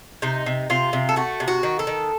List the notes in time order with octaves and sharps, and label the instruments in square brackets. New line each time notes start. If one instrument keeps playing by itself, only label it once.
[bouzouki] C3 D#4
C3
C3 F4
C3
A4
A3 F#4
C3
F#4
D#3
A4
D#3